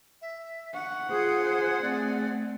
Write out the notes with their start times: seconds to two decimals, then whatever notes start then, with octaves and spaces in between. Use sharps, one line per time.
0.22 E5
0.74 F#5 C#6
1.10 F4 G#4 C5 D#6
1.82 A3 C4 D5